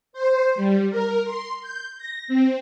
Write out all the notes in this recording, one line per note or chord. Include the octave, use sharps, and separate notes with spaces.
C5
G3
A#4
C6
G6
A#6
C4